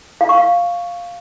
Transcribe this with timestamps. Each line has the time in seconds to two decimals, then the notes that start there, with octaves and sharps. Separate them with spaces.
0.21 F5
0.29 C#6
0.38 F5